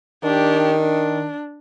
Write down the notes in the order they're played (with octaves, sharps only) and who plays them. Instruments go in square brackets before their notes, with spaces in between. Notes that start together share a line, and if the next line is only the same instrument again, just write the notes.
[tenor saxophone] D#3 [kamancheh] D4 G4
[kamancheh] D4